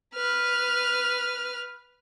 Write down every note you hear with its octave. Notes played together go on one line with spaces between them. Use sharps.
B4 F6